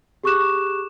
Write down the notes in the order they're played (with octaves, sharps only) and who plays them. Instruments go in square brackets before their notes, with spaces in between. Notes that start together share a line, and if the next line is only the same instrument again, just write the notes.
[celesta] G4 G#4 C#6 D6 F#6 E7